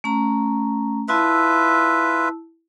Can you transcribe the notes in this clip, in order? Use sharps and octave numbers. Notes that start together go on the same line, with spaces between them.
A3 C#4 A#5
E4 F4 B4 E5 A5 E6